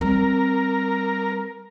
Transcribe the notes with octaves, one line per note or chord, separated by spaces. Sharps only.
G3 C4 A#4